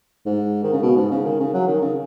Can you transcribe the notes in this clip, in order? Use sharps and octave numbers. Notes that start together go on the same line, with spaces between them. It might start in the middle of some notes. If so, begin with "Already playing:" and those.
G#2
D#3
C#3
B2
G#2
C#3
D#3
C#3
F#3
D#3
C#3